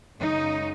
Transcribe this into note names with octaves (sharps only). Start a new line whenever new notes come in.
F#2 C#3 G#3 D#4